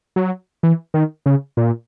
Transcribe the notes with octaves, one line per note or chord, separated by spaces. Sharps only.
F#3
E3
D#3
C#3
A#2